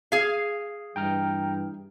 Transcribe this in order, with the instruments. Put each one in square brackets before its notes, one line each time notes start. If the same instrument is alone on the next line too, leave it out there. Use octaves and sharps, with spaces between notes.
[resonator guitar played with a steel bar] G#4 F5
[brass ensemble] G2 E3 [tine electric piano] G5 A#5 F6